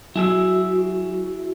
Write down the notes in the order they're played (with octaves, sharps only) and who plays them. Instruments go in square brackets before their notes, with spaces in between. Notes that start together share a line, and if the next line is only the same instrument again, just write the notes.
[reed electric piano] F#3 [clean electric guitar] E4 G#4 E5 [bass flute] F#4